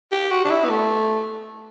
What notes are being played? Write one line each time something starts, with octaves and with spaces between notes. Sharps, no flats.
G4
F#4
D4
E4
B3
A3